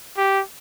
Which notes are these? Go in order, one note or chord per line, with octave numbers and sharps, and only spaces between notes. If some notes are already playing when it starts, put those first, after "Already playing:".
G4